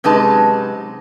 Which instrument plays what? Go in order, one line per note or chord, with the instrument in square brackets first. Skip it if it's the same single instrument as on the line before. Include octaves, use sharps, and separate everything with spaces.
[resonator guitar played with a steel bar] F#2 C3 G#3 D#4 B4 A5